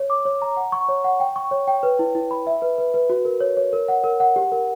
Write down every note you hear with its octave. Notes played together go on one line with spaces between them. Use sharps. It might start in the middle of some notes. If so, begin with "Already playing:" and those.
Already playing: C#5
D6
C#5
A#5
F#5
C#6
C#5
F#5
G5
C#6
C#5
G5
B4
E4
E4
B5
E5
B4
B4
B4
F#4
A#4
C#5
C#5
A#4
F#5
A#4
F#5
G4
A#4